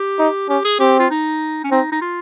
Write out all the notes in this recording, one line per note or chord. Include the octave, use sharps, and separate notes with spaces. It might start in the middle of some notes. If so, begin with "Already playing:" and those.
Already playing: G4
D#4
C#4 G4
G#4
C4 G4
F4
D#4
C#4
C4 D#4
D#4
F4